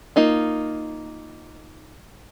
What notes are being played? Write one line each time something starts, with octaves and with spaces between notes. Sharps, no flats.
A#3 D#4 F4